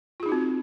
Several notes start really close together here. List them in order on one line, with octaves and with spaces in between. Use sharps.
F4 G#4 D#4 F#4 C4